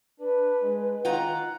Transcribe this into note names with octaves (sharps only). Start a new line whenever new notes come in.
D4 B4
G#3
D#3 F4 F#5 A#5